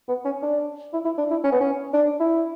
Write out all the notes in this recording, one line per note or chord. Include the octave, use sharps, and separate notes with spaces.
B3
C#4
D4
E4
E4
D4
E4
C#4
B3
C#4
D4
E4